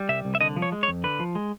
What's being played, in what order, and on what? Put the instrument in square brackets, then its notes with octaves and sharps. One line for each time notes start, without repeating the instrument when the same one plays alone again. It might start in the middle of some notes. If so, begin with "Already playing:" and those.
Already playing: [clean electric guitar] G3
C2 E5
C2
E5
D3 D#5
F3
C#5
G#3
C#5
F2
D3 B4
F3
G#3